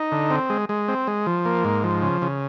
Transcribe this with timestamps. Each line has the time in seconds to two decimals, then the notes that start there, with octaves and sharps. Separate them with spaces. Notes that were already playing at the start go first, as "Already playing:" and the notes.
Already playing: D#4
0.12 D3
0.30 C4
0.50 G#3
0.69 G#3
0.88 C4
1.07 G#3
1.26 F3
1.45 A#3
1.65 G#2
1.84 F3
2.02 C#3
2.22 C#3